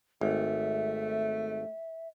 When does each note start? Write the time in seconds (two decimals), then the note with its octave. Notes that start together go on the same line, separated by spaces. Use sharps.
0.21 G#1 A3 E5